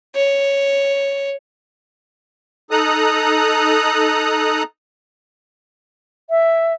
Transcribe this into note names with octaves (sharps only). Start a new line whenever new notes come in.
C#5
D#4 A4 A#5 D#6 F#6
E5